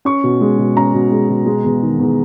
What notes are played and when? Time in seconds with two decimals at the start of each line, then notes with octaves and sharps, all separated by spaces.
0.05 C#4 C#6
0.24 B2
0.41 G#3
0.58 B2
0.77 C#4 A#5
0.94 B2
1.11 G#3
1.29 B2
1.46 G#3
1.64 E2
1.82 D#3
1.99 E2